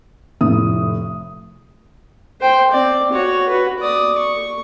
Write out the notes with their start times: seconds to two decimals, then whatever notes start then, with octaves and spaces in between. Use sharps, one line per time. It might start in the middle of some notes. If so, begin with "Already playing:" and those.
0.41 F1 A2 D#6
2.41 C5 G5
2.71 C4 D5
3.12 F#4 C#5
3.49 F#4 B4
3.79 D5 D#6
4.18 C#6